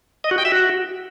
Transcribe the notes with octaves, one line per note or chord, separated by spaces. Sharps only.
D#5
F#4
G5
E5
F#4